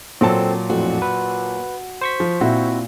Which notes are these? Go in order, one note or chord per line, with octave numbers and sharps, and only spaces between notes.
A#2 F#3 C4 A4 A5
F2 A2 F#4
B4
C5 C#6 B6
F3
A#2 C4 E4 F#4